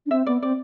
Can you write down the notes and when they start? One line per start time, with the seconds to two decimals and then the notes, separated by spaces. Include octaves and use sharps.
0.06 D4
0.11 C4 E5
0.27 B3 D5
0.42 C4 D5